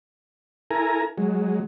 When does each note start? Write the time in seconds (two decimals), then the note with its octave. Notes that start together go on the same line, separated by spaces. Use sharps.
0.71 E4 A4 A#4 G#5 A#5
1.18 F#3 G#3